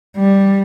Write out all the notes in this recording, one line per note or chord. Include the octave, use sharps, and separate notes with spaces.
G3